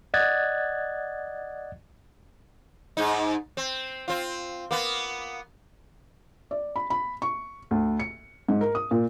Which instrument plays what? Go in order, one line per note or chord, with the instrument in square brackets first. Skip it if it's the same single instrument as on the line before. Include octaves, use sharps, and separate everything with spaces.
[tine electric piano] D5 D#5 F#5 F#6 G#6 A6
[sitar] G#2 D#4
C4
C4 F4
A#3 B3
[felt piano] D5
B5
B5
C#6
D2
C#7
G#2
A#4
D#6
A#2